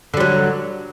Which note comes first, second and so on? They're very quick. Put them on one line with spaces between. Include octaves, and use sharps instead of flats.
D3 G3 F#3